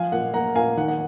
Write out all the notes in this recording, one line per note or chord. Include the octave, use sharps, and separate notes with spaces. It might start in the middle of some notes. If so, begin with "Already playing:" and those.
Already playing: F3 F5 G#5
A#2 F#5
A#3 F#5 A#5
A#2 F5 G#5
D#3 F#5
F#5